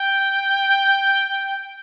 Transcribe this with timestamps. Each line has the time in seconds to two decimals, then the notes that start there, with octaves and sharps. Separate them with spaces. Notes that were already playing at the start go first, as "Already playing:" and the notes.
Already playing: G5